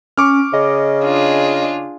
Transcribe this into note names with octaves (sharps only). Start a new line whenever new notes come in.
C#4 C#6 D6 F6
C#3 D#5
D4 F4 G#4